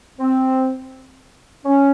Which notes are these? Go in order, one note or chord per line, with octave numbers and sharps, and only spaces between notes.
C4
C#4